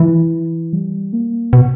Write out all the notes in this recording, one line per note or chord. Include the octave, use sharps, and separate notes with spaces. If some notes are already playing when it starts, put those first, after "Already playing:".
Already playing: E3
G3
A#3
B2